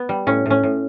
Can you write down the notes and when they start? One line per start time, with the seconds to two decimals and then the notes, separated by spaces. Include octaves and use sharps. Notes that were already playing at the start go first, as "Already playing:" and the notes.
Already playing: B3
0.09 G3
0.27 A2 C#4
0.46 A2 C#4
0.63 A2